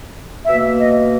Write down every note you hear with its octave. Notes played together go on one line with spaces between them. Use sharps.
B2 A#3 E5
D#5